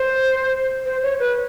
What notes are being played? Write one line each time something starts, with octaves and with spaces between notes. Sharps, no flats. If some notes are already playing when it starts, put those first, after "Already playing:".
Already playing: C5
C5
C#5
B4